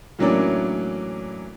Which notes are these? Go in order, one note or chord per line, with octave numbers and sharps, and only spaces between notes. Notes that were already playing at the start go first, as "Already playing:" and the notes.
A2 E3 F#3 A#3 C#4 D4